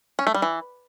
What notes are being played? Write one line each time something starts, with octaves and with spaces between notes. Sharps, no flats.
C#4
A3
G3
E3